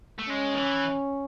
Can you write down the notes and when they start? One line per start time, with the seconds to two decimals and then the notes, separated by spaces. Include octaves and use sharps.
0.19 A3
0.29 G#3 C#4
0.54 D#3
0.58 E3